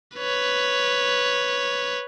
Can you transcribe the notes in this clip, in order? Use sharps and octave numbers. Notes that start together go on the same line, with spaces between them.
B4 C#5